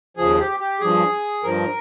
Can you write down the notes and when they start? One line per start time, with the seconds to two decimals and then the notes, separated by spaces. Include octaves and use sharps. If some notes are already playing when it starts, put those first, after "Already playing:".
0.17 D#2 C#3 F3 G#4
0.38 G4
0.60 G4
0.80 G2 F3 G#4
1.44 G2 F3 A#4